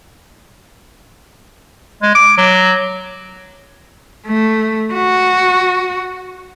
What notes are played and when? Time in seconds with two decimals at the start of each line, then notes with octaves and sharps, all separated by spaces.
2.02 G#3
2.15 D6
2.37 F#3
4.27 A3
4.94 F#4